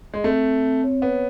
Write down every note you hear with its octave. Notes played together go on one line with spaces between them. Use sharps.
G#3
A3 C4
C4
C4
C#5
B3 C#5